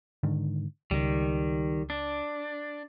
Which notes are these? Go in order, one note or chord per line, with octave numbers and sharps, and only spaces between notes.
G#2 D3 D#3
C#2 D#3 G3
D4